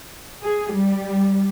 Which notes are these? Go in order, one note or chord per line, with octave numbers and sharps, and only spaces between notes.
G#4
G3